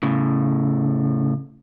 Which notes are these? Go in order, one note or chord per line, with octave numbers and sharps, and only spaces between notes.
A2 C#3